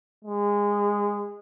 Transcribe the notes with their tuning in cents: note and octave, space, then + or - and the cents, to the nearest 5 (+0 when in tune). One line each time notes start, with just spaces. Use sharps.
G#3 -20